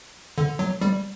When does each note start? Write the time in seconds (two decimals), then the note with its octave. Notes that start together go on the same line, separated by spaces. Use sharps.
0.38 D3
0.59 F#3
0.81 G3